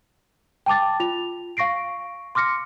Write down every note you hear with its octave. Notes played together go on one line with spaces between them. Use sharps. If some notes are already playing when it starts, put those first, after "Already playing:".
G5 A5 D6 A6
F4 F7
F5 C#6 A#6 C7 D7
C6 D6 F6 A#6 C#7